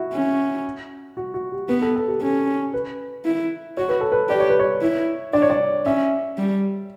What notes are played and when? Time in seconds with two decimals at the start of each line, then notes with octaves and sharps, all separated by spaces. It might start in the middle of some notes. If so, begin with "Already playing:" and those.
Already playing: E4 F#4
0.13 C#4
1.17 F#4
1.34 F#4
1.52 G4
1.69 B3 B4
1.82 A4
1.95 A4
2.08 G4
2.21 C#4 A4
2.74 B4
3.25 E4
3.77 F#4 C#5
3.89 B4
4.01 A4
4.12 B4
4.29 G4 D5
4.40 C#5
4.49 B4
4.59 C#5
4.81 E4
5.33 D4 D5
5.42 C#5
5.50 D5
5.86 C#4 E5
6.38 G3